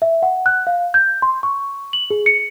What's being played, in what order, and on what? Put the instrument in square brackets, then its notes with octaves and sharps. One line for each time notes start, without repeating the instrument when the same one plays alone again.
[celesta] E5
F#5
F#6
F5
G6
C6
C#6
F#7
G#4
C#7